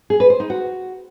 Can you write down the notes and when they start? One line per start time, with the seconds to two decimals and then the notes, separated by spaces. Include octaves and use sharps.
0.10 G#4
0.20 B4
0.30 C5
0.40 D#4
0.50 F#4